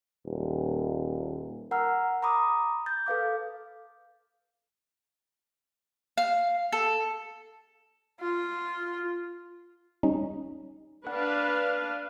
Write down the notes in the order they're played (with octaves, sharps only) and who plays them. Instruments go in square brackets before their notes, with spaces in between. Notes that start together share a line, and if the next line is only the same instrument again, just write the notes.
[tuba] D#1
[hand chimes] A#4 F#5 A#5 E6 F6
A#5 B5 D6 D#6
G6 A6
A4 B4 F5 D6
[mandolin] F5
A4
[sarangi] F4
[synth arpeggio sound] G3 C#4 D#4
[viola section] D4 B4 F5 [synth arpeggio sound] F#5